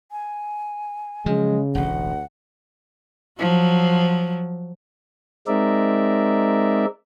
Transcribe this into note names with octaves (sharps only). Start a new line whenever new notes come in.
G#5
C#3 F3 F#3 G#3
E1 A1 D2 F#5
F3 F#3
G#3 C4 D#4 A#4 D5 E5